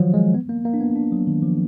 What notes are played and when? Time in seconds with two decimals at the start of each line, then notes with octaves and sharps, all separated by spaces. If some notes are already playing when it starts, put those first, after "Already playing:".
Already playing: D#3 F3 F#3
0.14 G#3
0.34 B3
0.49 A#3
0.65 A#3
0.74 D4
0.80 B3
0.96 D4
1.12 F#3
1.27 D#3
1.42 F3